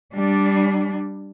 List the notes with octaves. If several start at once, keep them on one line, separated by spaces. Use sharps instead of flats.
G3 D4